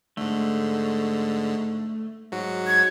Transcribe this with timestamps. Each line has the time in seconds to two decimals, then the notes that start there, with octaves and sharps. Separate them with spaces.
0.17 G#2 D3 A3
2.32 G#2 F#3 F#4
2.67 G#6